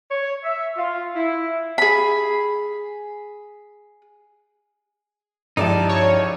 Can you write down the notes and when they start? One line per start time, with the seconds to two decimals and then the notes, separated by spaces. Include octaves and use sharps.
0.11 C#5
0.43 E5
0.76 F4
1.15 E4
1.78 G#4 B5
5.57 C#2 G2 F3 D#4 E4 G4 D5 A5
5.89 C#5